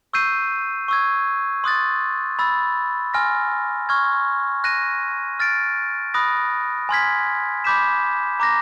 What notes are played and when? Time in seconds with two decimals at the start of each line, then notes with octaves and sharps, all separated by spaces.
0.13 C#6 E6 G6 C7 D#7
0.88 C#6 E6 G#6
1.64 C6 D#6 F#6 A6
2.39 B5 E6 A6
3.14 G#5 C6 F6 A#6
3.89 C#6 F6 G#6
4.64 F#6 A#6 D#7
5.40 F6 A6 D7
6.14 B5 D#6 F#6 A#6
6.89 G#5 C6 F6 G#6 B6
7.64 B5 D6 G6 B6 E7
8.40 A#5 D6 F#6 A#6